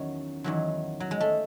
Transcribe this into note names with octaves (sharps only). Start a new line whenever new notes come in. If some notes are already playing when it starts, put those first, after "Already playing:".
Already playing: E2 D#3 F#3 C#4
E2 D#3 F#3
F#3
G#3
A3